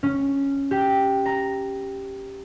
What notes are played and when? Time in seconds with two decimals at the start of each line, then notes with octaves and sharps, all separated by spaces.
0.03 C#4
0.71 G4
1.26 A#5